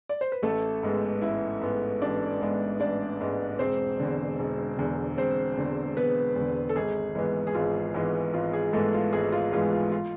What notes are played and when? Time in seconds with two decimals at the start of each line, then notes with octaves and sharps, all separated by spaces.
0.09 D5
0.21 C5
0.32 B4
0.43 A1 A3 A4
0.83 G#2 G#3 B3
1.21 A1 E4 E5
1.61 G#2 G#3 B3
2.02 A1 D4 D5
2.41 G#2 G#3 B3
2.80 A1 D4 D5
3.20 G#2 G#3 B3
3.59 E1 C4 C5
3.99 E2 D3
4.39 E1
4.78 E2 D3
5.18 E1 C4 C5
5.57 E2 D3
5.97 E1 B3 B4
6.36 E2 D3
6.69 A4
6.76 G#1 G#4
7.15 G#2 E3 G#3 B3
7.47 G#4
7.54 G#1 F4
7.94 G#2 E3 G#3 B3
8.33 G#1 F4
8.53 G#4
8.73 G#2 E3 G#3 A3 B3 A4
8.94 F4
9.13 G#1 G#4
9.32 F4
9.52 G#2 E3 G#3 B3 F4
9.73 F4
9.92 F4